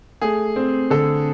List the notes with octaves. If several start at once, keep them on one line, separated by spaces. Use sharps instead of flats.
A3 G#4
C4
D3 A4